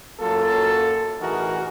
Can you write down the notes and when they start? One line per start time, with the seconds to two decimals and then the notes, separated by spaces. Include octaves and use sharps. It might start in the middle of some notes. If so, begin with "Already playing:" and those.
0.20 F#2 F#3 A#3 F4 A4
1.20 A1 E3 D#4 F#4 G#4 A#4